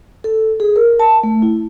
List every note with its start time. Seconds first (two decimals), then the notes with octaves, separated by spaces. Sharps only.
0.24 A4
0.60 G#4
0.76 A#4
1.00 A5
1.23 A3
1.42 E4